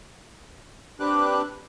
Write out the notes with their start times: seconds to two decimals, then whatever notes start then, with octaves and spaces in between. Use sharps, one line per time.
1.00 C4 D4 G4 B4 D6 F#6